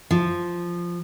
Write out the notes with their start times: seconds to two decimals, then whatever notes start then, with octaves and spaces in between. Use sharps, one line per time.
0.11 F3